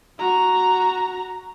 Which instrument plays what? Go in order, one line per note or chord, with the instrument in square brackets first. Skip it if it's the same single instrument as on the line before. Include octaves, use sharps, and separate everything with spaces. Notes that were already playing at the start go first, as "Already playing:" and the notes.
[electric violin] F#4 A#5